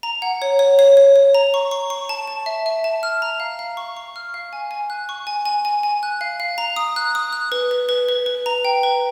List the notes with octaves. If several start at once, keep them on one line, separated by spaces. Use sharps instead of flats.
A#5
F#5
C#5
C#5
C#5
C#5
C#5
A#5
C#6
C#6
C#6
A5
A5
E5
E5
A5
F6
A#5
F5
F5
C#6
C#6
F6
F5
G#5
G#5
F#6
C#6
G#5
G#5
G#5
G#5
F#6
F5
F5
A#5
D#6
F#6
D#6
F#6
B4
B4
B4
B4
B4
A#5
G5
B4